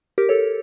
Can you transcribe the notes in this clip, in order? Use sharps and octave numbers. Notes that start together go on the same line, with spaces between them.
G4 A#4
A4 C#5